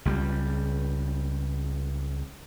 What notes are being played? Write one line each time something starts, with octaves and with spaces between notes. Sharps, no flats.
C#2 G3